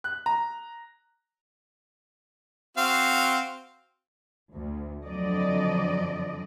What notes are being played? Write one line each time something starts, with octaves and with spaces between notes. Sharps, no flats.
F#6
A#5
C4 F#4 F5
D2
F2 D3 F#3 D5 D#5